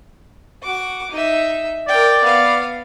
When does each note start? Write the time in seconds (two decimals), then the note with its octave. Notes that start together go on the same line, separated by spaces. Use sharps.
0.63 F#4 D6
1.11 D#4 E5
1.88 A#4 D5 G5
2.24 B3 F5